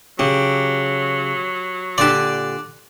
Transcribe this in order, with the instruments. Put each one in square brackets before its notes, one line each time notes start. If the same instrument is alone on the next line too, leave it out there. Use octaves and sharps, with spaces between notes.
[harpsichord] C#3 [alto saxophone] F#3 [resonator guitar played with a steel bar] G4
[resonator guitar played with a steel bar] A#2 D3 G4 [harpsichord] D5 A5 [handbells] D6 F#6